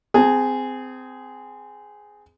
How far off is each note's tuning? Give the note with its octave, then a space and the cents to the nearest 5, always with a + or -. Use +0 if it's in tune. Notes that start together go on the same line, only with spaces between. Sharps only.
C4 -25 G#4 +0 A5 +30